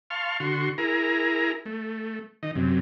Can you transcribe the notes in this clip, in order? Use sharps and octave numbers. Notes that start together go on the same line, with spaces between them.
F5 A5 C6 C#6 F6
D3 F#4 C6 C#6
E4 G#4 A#4 A#5
A3
D#3 D#5
F#2 C3